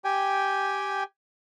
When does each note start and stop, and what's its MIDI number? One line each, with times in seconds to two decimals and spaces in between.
0.04 1.04 67
0.04 1.04 79
0.04 1.04 80